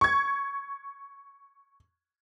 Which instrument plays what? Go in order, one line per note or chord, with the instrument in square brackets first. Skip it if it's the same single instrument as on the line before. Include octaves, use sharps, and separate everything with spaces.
[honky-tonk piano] C#6 G#6